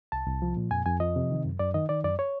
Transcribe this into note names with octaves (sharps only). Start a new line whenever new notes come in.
C2 A5
C2
F3
A#2
F2 G#5
F2 G#5
F3 D#5
C3
D#3
F#2
F#2 D5
D#3 D#5
D#3 D5
F#2 D5
C#5